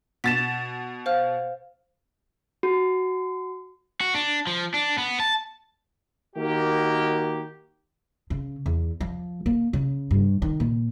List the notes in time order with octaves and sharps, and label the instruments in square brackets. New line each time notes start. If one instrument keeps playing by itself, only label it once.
[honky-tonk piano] B2 A6 E7 [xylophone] B6
[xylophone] C5 F5 F6
[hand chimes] F#4
[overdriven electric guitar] F#4
D4
F3
D4
B3
A5
[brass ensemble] D#3 A#3 F#4 G4
[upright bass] C#3
E2
F3
A#3
C#3
G2
D#3
A#2